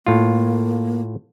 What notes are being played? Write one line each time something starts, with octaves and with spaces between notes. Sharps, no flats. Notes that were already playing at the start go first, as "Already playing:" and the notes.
A2 A#3 F4